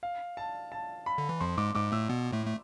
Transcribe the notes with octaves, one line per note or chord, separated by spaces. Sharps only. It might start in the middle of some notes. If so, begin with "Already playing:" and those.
F5
A5
A5
B5
D3
E3
F2 F3 C6
G#2 G#3 D6
G#2 G#3 D6
A2 A3 E6
B2 B3
A2 A3
A3